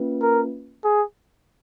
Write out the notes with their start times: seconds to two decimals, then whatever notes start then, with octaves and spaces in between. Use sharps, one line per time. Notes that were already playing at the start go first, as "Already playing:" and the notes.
Already playing: A#3 C#4 F4 B4
0.22 A#4
0.84 G#4